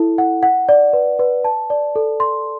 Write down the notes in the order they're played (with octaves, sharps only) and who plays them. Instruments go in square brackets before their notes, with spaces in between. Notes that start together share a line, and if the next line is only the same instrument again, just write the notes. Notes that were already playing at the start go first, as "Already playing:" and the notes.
Already playing: [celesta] E4 A4
F#5
F#5
D5
B4
B4
A5
D5
A4
C6